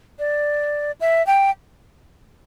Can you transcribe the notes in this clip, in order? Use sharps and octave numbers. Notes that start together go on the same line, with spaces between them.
D5
E5
G5